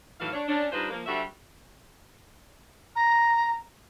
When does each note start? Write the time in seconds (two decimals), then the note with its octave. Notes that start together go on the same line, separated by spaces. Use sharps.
0.20 A2 D#3 E3 F#3 F5
0.33 D4 C#5
0.48 C#4 D4
0.72 G3 D4 D#4 F4 B4 C5
0.90 F3 A#3
1.06 D3 G3 F#4 C5 E5
2.96 A#5